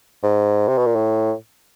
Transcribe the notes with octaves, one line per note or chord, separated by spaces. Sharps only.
G#2
C3
B2
A#2
A2